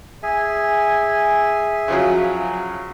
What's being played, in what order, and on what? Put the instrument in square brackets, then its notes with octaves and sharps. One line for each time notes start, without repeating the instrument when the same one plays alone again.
[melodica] G#4 E5 G#5
[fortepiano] C#3 F3 F#3